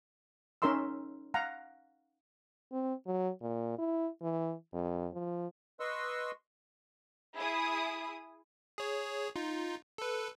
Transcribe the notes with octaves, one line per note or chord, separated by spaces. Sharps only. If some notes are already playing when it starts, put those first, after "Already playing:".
C#4 D#4 A#4 E5 C6 E6
F5 F#5 A#5
C4
F#3
A#2
E4
E3
F2
F3
B4 D#5 C6 C#6 E6
E4 G#4 D#6
G#4 C#5
D#4 F4
A4 B4